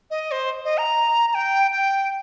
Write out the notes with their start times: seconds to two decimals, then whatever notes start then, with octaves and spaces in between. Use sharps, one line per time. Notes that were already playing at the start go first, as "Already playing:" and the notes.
0.10 D#5
0.31 C5
0.65 D#5
0.78 A#5
1.31 A#5
1.35 G5
1.72 G5